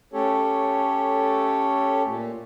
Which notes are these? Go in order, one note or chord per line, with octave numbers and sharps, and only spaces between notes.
A3 C#4 G4 A4 C#5
A#2